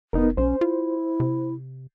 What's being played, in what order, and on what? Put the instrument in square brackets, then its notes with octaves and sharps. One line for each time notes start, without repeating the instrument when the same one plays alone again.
[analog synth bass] F1 [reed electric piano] B3 D#4 A#4
[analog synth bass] B1 [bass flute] C#4 [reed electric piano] C5
[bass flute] E4 [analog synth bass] F4
[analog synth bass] C3